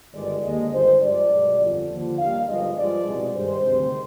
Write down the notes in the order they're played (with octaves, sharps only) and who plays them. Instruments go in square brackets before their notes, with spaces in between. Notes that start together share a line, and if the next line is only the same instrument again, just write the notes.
[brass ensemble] G1 G2 D#3 G#3 D5
D#2 D3 G#3 D#5
G1 G2 D#3 G#3 C5
G2 F3 G#3 D5
B1 B2 G#3
G1 F2 D3 F3
D#2 D3 F3
D#2 D#3 G3 F5
G1 G2 F3 G#3 D#5
G2 F3 G#3 D5
C2 B2 G#3
G2 D#3 G#3 C5
D2 C3 D#3 G#3